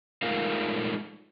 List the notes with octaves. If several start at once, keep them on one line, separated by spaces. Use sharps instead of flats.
G#3 A3 D#4 F4 A#4 F5